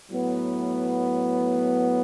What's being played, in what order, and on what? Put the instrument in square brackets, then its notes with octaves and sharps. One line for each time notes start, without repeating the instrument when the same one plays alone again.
[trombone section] A2 F#3 B3